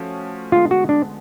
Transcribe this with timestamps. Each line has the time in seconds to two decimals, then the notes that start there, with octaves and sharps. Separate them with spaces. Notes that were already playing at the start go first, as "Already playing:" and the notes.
Already playing: F3 A3 C#4 F#4
0.52 D3 G#3 B3 F4
0.71 F#4
0.89 D4